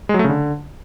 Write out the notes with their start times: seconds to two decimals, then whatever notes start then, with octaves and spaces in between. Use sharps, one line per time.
0.09 G#3
0.14 F#3
0.19 A3
0.24 C#3
0.29 D3